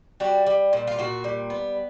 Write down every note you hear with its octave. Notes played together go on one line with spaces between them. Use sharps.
G3 F#4
G3
A#2
F4
A#2 F#4
G3
B3